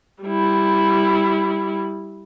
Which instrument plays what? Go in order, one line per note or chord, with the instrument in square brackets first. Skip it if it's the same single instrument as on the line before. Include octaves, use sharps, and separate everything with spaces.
[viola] G3 E4